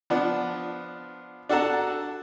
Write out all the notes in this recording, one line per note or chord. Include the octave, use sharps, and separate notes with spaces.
F3 B3 D4
D4 F#4 A4 F#5 A5 A#5